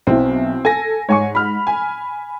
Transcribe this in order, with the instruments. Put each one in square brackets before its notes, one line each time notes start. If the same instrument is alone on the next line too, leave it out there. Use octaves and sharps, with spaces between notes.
[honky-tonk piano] B1 E4 [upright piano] C4
[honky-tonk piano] A4 A#6 [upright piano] G#5
[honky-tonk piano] G#2 [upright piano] C#5 G#5 C#6
[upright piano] B5 F6
[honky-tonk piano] G#5